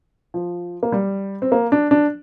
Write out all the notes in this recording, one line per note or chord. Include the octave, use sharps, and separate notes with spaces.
F3
A#3
G3
C4
A#3
D4
D4